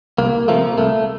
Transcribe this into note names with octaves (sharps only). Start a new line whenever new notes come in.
C2 A#3
C3 F3 A3 A#3
C2 A3